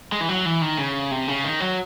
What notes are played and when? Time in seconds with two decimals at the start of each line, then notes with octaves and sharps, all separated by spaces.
0.12 G#3
0.20 E3
0.29 F#3
0.45 E3
0.61 D#3
0.78 C#3
1.11 C3
1.28 C#3
1.44 D#3
1.60 F#3